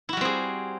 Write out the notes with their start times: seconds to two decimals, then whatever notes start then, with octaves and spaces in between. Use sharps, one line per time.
0.09 E4
0.13 F#4
0.17 G3
0.21 C4
0.25 G#4